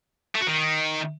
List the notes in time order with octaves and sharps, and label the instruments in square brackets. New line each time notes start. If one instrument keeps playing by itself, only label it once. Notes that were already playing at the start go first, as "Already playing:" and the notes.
[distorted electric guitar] A3
F#4
D#3